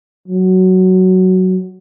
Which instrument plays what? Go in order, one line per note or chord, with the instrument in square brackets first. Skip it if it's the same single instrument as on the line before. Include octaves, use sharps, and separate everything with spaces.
[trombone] F#3